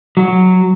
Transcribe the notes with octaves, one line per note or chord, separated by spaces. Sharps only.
F#3